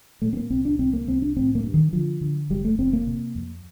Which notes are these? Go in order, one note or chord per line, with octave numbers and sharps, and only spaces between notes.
A#2 A3
C4
A#3
C2 C4
D4
C2 C4
A#3
C2 C4
D4
A1 C4
A#3
G2
D#3
D3 F3
D3
F1 G3
A3
F1 C4
A#3
C3
F2